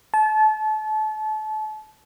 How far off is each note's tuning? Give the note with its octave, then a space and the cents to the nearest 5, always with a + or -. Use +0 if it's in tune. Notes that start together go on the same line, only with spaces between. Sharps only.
A5 -30